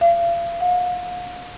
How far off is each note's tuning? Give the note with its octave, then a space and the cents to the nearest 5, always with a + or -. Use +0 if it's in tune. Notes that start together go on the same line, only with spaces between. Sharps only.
F5 -35
F5 +45